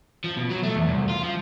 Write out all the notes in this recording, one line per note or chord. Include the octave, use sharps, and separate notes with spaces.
F3
B2
F#3
A3
E2
C2
F4
F3